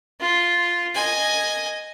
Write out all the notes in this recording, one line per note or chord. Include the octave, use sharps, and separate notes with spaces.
F4
D#5 G#5